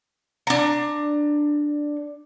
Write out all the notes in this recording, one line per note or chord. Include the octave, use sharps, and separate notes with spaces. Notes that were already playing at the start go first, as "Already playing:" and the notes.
D4 A#5